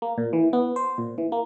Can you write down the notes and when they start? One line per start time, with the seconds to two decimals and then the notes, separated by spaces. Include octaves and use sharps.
0.02 A#3
0.18 A#2
0.33 E3
0.53 B3
0.76 C5
0.98 A#2
1.18 E3
1.32 A#3